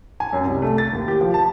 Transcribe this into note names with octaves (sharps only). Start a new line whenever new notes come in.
G#5
F#2
C2
A3
A6
D#2
G4
F3
A5